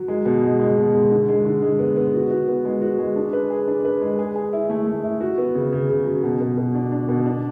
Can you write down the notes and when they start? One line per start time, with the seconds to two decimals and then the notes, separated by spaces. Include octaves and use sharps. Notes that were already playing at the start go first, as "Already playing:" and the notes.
Already playing: F#3
0.08 G#3
0.26 B2
0.42 G#3
0.60 G#3
0.77 B2
0.94 G#3
1.11 D3
1.28 G#3
1.45 D3
1.62 G#3
1.79 B3
1.96 B3
2.14 F#4
2.31 F#4
2.48 B3
2.65 G#3
2.82 F#4
2.99 G#3
3.16 D4
3.33 B4
3.50 G#4
3.68 D4
3.85 B4
4.01 G#3
4.19 G#4
4.36 G#4
4.53 E4
4.70 A3
4.87 A3
5.04 E4
5.21 F#4
5.38 B3
5.55 C#3
5.73 C#3
5.90 C#3
6.06 F#3
6.24 B2
6.40 B2
6.57 B2
6.75 D4
6.92 D4
7.09 B2
7.25 D4